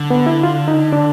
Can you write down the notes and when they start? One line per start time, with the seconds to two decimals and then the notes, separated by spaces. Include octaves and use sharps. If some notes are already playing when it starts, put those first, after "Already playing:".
Already playing: D3
0.10 B3
0.26 E4
0.43 F4
0.68 D#4
0.93 D4